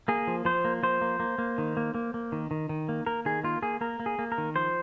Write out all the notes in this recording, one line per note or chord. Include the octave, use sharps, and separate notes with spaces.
A#3 G#4
F3
F3 C5
A#3
F3 C5
A#3
A#3
A#3
D#3
A#3
A#3
A#3
D#3
D#3
D#3
A#3
A#3 A#4
D#3 G#4
A#3 F4
A#3 G#4
A#3 A#4
A#3
G#4
A#3
A#4
D#3
F3 C5